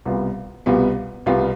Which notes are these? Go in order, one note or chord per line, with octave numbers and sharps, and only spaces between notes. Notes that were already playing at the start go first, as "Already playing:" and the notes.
C2 B2 G3 B3 F4
C2 B2 G3 B3 F4
C2 B2 G3 B3 F4